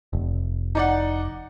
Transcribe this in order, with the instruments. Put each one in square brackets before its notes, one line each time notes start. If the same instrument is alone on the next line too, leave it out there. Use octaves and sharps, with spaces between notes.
[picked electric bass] F1
[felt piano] D#4 D5 F#5